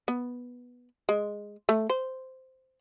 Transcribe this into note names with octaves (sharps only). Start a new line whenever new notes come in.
B3
G#3
A3
C5